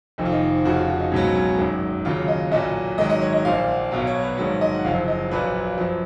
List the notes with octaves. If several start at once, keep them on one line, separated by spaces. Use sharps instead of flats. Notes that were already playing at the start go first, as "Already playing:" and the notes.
F1 F2 D#3 D#4
F4
D#4
F2 C#3 F3 F#4
F4
F#4
D#4
C#2 B2 F#3 C#4
C#4
G#1 F#2 D#3
D#2 C#3 F#3 F4
D#5
B1 A#2 F#3 D#5
G#1 G#2 D#3 F#3 D#5
D#5
C#5
D#5
A#1 A#2 F3 F5
F#5
B1 B2 F#3 F5
C#5
B4
A#1 G#2 D#3 F#3 C#5
D#5
F#5
F#1 F#2 F3 F5
D#5
A#1 A#2 F#3 B4
F#2 F3